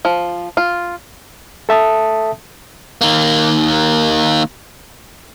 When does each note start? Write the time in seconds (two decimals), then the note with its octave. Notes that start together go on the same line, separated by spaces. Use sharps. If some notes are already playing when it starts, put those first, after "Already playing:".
0.05 F3
0.57 F4
1.69 A4 E5 A5 D#6
3.01 D#3 A#3